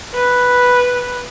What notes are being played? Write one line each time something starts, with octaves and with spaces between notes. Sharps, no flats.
B4